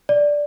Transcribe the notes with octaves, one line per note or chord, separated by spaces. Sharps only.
D5